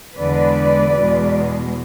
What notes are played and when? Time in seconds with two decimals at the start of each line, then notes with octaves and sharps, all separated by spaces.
0.18 E2 D3 G#3 B4 D5
0.96 E2 B2 G#3